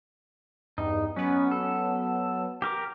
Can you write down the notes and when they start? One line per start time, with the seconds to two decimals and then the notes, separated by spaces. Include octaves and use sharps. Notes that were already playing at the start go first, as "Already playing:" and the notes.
0.78 E2 G2 D#4
1.16 F#3 B3 C#4
1.51 A4
2.62 G4 A#4 D6